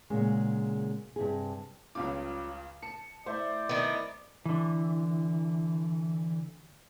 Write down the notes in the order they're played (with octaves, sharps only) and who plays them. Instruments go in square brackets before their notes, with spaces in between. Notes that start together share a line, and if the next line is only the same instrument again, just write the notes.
[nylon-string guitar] A#2 C#3 F#3 G#3
G2 C3 G#4
[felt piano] C#2 C#3 D6 [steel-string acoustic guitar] F#3 G3 F4
[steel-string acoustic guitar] A5 [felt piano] C#7
[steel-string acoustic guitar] A3 E4 E5 [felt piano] C5 [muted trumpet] D5
[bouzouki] D#3 B3
[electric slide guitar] D3 E3